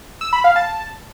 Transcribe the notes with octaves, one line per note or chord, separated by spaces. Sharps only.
E6
B5
F5
A5